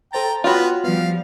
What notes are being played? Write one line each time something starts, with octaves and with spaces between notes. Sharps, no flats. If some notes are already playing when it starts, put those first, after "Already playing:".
A4 C5 G5 A#5 A6
B3 F4 F#4 B4 C#5 G5 C6
F3 G3 B3 F5